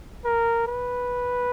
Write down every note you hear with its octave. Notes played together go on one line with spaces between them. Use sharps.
A#4
B4